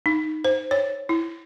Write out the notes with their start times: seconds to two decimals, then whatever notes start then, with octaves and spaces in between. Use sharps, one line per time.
0.06 D#4
0.44 C5
0.71 C#5
1.09 E4